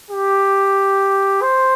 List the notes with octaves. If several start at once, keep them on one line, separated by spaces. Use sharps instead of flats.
G4
C5